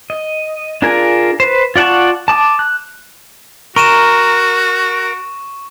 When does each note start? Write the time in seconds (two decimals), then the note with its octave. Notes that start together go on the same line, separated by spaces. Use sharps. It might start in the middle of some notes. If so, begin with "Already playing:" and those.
0.10 D#5
0.82 D4 F4 G#4 A#4 G#5
1.40 B4 C5
1.76 F4 D5 F#5 A5 C#6
2.28 A5 D6 D#6
2.59 F#6
3.76 F#4 A#4 C#6 D#7 E7